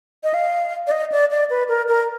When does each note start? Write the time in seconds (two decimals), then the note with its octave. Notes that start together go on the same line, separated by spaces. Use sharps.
0.24 D#5
0.34 F5
0.87 D5
0.91 D#5
1.12 D5
1.31 D5
1.50 B4
1.69 A#4
1.88 A#4